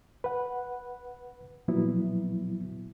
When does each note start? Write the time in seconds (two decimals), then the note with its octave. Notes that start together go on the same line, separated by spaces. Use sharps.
0.24 B4 F#5
1.68 A#2 F3 F#3 B3 E4